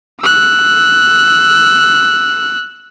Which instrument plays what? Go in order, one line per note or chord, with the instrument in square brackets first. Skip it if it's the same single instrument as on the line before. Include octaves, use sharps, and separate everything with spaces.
[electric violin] E6 F#6